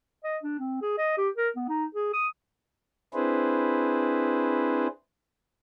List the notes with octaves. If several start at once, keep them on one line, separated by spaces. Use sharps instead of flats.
D#5
D4
C4
G#4
D#5
G4
A#4
B3
D#4
G#4
D#6
C4 D4 E4 G#4 B4 C5